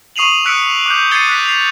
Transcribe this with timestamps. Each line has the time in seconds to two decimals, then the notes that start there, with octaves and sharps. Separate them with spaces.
0.16 C#6 D#6 C7 D#7 F7 F#7
0.45 D#6 E6 F#6 B6 C#7 D7
0.86 D6 F#6 G6
1.11 G#6 A6 C7 C#7 D#7 G7
1.27 D6 F#6 B6
1.45 C7 F7